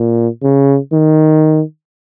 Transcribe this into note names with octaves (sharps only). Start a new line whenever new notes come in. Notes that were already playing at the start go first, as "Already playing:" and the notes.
Already playing: A#2
C#3
D#3